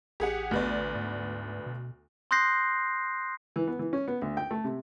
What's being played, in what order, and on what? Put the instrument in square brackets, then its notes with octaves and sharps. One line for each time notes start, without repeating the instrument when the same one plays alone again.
[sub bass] A1 [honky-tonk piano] G4 G#4 F#5
[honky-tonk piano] D2 B3 D5
[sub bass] G#2
B2
[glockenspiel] C6 D#6 F#6 G6 A#6 C7
[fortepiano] E3
B3
E3
C#4
B3
D2
G5
A3
C3